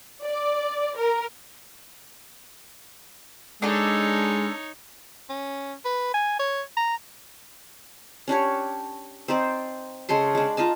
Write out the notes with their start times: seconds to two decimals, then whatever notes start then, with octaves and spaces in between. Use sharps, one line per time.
0.23 D5
0.98 A#4
3.62 G#3 D4 D#4 A4 C#5
5.30 C#4
5.85 B4
6.14 G#5
6.40 C#5
6.77 A#5
8.28 C#4 D4 G4 C#5
9.28 C4 D#4 C5 D5
10.09 C#3 G#3 A4 C6
10.35 G#3 D4
10.57 D#4 F4 D#5 A5